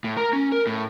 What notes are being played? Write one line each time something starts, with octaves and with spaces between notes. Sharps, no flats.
A2
A#4 A#5
C#4
A#4
A2